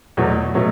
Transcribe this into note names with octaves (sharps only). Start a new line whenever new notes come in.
E2 B2 F#3 A3
B2 F#3 A3